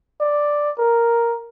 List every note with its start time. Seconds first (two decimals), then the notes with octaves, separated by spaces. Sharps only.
0.20 D5
0.78 A#4